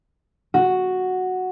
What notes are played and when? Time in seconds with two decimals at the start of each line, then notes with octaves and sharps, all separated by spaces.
0.54 F#4